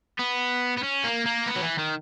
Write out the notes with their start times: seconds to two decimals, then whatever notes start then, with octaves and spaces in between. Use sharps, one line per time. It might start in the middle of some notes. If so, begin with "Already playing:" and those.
0.19 B3
0.77 B3
0.83 C#4
1.04 A#3
1.25 A#3
1.46 B3
1.56 F#3
1.63 E3
1.78 D#3